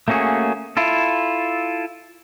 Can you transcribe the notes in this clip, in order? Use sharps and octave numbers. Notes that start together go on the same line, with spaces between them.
A3 A#3 C#4 F#4 G#4
E4 F4 A4